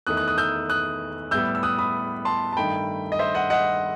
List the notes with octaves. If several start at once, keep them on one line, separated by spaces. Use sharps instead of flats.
E2 D#3 A3 D#4 D#6 F#6
D#6 F#6
D#6 F#6
E6 G6
D#6 F#6
A2 G3 B3 E4 E6 G6
E6
D#6 F#6
B5 D#6
A5 C6
A5
G2 D#3 A3 D#4 G5 B5
D#5
C5 E5
D#5 F#5
D#5 F#5